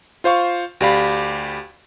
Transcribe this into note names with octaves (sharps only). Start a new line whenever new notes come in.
F4 C5 F5 C#6
D2 G4 D5 F5 B5